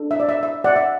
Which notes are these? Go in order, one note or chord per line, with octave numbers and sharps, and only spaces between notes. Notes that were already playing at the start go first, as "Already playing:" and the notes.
Already playing: D4 A4
E5
D5
E5
E5
D5 F#5
E5